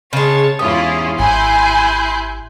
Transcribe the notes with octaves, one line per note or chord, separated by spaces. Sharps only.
C#3 G#3 C#5 A5
E2 G#2 C#4 E4 F4 G4 D#6
G#1 E4 G#5 C6 F#6 G6